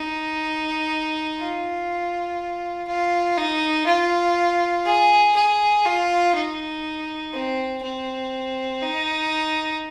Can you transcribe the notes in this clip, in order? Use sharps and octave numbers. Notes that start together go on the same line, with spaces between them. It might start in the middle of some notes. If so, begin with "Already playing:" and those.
Already playing: D#4
F4
F4
D#4
F4
G#4
G#4
F4
D#4
C4
C4
D#4